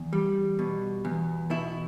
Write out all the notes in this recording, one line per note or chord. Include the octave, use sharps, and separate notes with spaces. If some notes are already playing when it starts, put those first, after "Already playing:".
Already playing: E2
G3
B2
E2
B2 E4